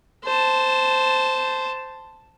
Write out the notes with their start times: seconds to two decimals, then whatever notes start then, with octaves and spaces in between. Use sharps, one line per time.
0.24 C5 A5